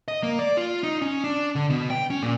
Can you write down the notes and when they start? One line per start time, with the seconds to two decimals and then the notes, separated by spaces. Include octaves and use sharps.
0.08 D#5
0.23 A#3
0.39 D5
0.57 F4
0.83 D#4
1.02 C#4
1.24 D4
1.55 D3
1.70 B2
1.90 G5
2.10 C#4
2.23 A#2